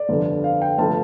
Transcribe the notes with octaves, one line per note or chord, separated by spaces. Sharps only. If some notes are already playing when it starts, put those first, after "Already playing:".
Already playing: D5
G1 F2 D3
F5
G5
G1 F3 A3 A5